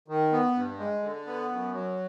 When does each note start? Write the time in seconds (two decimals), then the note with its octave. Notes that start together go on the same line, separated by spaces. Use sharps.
0.08 D#3
0.32 B3
0.55 G2
0.79 G#3
1.03 D3
1.27 B3
1.49 F#2
1.73 F#3